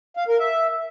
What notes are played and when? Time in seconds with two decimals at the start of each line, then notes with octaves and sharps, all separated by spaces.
0.17 F5
0.28 A#4
0.39 E5